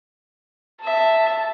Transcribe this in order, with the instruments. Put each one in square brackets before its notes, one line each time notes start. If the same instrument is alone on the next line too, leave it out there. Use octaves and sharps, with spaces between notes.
[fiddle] E5 [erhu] A5